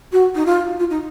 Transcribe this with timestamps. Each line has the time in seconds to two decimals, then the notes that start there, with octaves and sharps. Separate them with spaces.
0.12 F#4
0.35 D#4
0.46 F4
0.79 F4
0.90 D#4